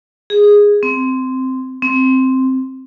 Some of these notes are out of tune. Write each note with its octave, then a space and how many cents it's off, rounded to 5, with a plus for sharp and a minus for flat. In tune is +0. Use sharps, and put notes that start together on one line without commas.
G#4 -10
C4 -10
C4 +0